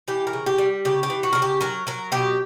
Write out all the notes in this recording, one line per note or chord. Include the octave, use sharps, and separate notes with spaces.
E3 G4
A#4
C#3
G4
G3
C#3 G4
G4
E3
F#4
C#3 A#4
G4
F#3 A#4
F#3 A#4
B2 G4